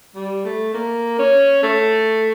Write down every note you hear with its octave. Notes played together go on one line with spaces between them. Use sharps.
G3
A3
A#3
C#4
A3